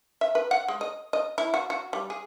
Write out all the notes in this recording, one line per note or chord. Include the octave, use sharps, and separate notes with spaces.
E5
B4
F#5
G#3
D#5
D#5
E4
F#4
F#4
G3
G#4